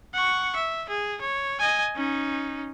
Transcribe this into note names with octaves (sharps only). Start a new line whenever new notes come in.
F#5 C#6
E5
G#4
C#5
D#5 G#5
C#4 D#4